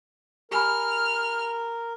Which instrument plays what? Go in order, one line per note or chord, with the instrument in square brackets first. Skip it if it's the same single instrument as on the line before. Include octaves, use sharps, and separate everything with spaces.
[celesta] G4 G#5 B5 [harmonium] A#4 [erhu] F6